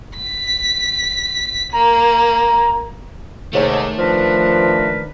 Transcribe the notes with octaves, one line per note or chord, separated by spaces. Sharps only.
B6
A#3 A#5
D#2 G#2 C3 D#3 A3 C#5
F3 D4 A#4 B4